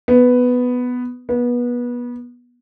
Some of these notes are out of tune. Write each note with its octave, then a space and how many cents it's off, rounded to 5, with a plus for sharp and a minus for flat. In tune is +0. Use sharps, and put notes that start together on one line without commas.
B3 +5
B3 -25